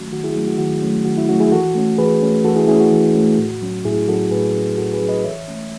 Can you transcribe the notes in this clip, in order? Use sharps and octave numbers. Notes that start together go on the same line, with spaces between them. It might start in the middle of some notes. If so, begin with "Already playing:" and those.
Already playing: D#3 F#3 A3 C#4 F#4
D#3 F#4
E4 G#4
F#3 A3 C#4
F#4
D#3 F#4
F#3 A3 C#4
D#3 F#4
E4
F#3 A3 C#4 F#4
E4 G#4
E3 F#4 A4
A3 C#4
E3 G#4 B4
A3 C#4
E3 F#4 A4
E4 G#4
A3 C#4 E4 G#4
F#4
E3
A3 C#4
A2
F#3 C#4
A2 E4 G#4
F#3 C#4 F#4 A4
A2 G#4 B4
F#3 C#4
A2 F#4 A4
G#4 B4
F#3 C#4
B4 D#5
E3 C#5 E5
A3 C#4